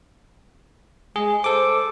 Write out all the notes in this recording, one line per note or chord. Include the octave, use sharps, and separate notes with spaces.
G#3 G#4
A4 C5 D6